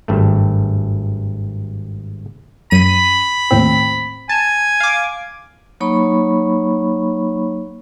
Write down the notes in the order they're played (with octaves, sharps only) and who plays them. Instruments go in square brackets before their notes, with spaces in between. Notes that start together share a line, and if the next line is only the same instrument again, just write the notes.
[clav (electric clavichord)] G#1 G2 A3
[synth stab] F#2 D#7 [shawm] B5
[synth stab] D#2 A2 C4
[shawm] G#5 [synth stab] A5
[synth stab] F5 D6
[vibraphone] F#3 A#3 D#4 C#5 B5 C#6